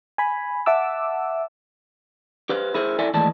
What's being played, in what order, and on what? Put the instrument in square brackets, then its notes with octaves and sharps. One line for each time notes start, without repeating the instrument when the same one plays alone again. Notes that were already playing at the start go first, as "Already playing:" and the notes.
[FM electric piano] G#5 B5
E5 F#5 A5 D6 E6
[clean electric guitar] G4 B4 C5 F5
E4 G#4 A#4 C5
E4 A4 D5 E5 G#5
D#2 A2 E3 G#3 D5 A5